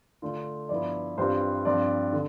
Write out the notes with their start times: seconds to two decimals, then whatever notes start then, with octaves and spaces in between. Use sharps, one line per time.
0.22 D3 A3 D4 F4
0.69 G2 F3 B3 E4 D5
1.18 G2 E3 G3 C4 F4 C5
1.65 G2 F3 C4 D5
2.13 D3